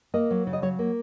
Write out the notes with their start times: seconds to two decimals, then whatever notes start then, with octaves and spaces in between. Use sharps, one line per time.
0.14 A#3 D#5
0.31 F#3
0.47 C#3
0.53 D#5
0.62 F#3 C#5
0.79 A#3